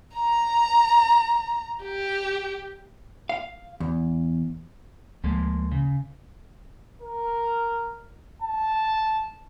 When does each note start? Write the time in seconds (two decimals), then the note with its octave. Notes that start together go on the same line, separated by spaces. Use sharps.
0.16 A#5
1.83 G4
3.29 F5
3.80 E2
5.24 D2 F3 G#3 A#3
5.72 C#3
7.02 A#4
8.42 A5